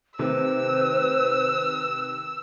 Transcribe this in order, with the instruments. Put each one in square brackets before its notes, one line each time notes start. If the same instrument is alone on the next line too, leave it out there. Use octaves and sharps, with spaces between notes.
[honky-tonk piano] C3 D#3 A3 [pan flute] B4 [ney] C5 [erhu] E6